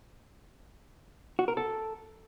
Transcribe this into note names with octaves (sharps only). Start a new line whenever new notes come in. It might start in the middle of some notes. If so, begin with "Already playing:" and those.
F#4
A#4
A4